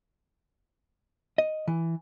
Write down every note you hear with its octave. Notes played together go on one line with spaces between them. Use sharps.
D#5
E3